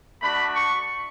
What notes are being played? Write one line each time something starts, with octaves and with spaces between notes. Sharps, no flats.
A3 D4 F#4 B5
C#6